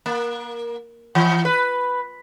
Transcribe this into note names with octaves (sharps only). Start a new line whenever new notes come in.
A#3
E3
B4